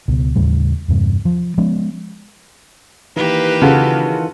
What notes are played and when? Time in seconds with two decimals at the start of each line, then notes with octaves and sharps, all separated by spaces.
0.08 C#2 B2
0.36 D#2 A2 C#3 G3
0.88 E2 G2 C3
1.25 F3
1.58 F3 G#3 B3 C#4
3.16 D#3 E3 A#3 G4 B4
3.62 C#3 F4 F#4 A4